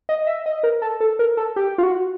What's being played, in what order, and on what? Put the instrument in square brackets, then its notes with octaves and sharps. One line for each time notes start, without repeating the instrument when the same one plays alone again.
[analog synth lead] D#5
E5
D#5
A#4
A4
A4
A#4
A4
G4
F4
F#4